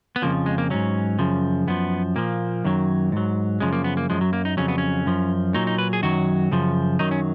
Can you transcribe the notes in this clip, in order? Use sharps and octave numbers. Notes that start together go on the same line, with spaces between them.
B3
F2 C#3 F3 A#3
G#3
A#3
G#2 F#3 C#4
F#2 C#3 F3
F#2 F3 B3
A#2 F3 A#3
F#2 D#3 F#3
G#2 F#3
F#2 C#3 F3 G#3
A#3
B3
A#3
F#2 F3 G#3
F#3
A#3
D#4
F2 C#3 F#3 C#4
B3
C#4
F#2 F3
A#2 F#3 D#4
D#4
B4
G#4
F#2 D#3 F#3 F#4
F#2 C#3 F3
F#2 D#3 F#3 D#4
C#4